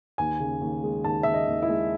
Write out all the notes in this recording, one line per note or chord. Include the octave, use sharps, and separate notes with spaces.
D#2 G#5
C#3
D#2
G#3
D#2 A5
C#3 E5
D#5
D#2
E4
G#3